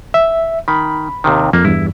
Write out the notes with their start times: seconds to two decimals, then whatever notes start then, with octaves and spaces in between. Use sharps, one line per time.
0.14 E5
0.68 D#3 B5
1.24 D#2 C3 D#3
1.53 F2 A#3
1.65 E2 G2 E4